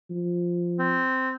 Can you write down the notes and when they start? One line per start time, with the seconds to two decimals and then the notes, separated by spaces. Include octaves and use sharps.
0.10 F3
0.79 C4